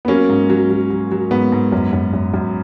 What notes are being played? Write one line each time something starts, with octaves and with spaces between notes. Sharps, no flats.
B3
F#3 A#3 C#4
G#2
F#3
F#3
F#3
F#3
G#2 B3
G#2
F#2
F#2
F#2
F#2